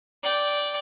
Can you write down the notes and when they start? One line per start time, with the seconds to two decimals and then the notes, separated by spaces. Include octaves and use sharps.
0.23 D5 G5